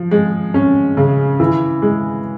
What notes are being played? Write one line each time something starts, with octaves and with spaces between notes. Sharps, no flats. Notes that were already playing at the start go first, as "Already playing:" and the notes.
Already playing: F3
G#3
C#4
C#3
E3
G#3